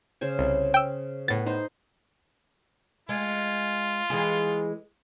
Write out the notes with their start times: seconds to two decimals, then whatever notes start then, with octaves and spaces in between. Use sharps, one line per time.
0.21 C#3 C5 G#5
0.39 C2
0.74 G5 E6
1.28 A2 B3 A6
1.46 D#4 C5 D#5
3.09 G#3 F4
4.10 E3 G#3 G#4